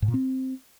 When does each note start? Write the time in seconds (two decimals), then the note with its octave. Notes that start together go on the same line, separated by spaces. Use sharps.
0.02 G#2
0.08 A#2
0.14 C4